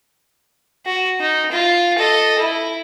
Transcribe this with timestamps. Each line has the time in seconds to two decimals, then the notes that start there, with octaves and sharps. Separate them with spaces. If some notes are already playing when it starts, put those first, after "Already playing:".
0.85 F#4
1.20 D#4
1.52 F4
1.98 A4 D#5
2.39 E4